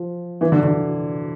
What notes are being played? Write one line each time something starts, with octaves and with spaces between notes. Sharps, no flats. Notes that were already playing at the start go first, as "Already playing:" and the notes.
Already playing: F3
E3
D3
D3